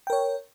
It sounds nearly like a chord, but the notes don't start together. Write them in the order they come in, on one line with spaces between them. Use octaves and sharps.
G5 A#4 C#5